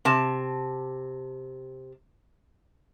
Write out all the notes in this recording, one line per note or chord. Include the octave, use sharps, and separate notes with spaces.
C3 A5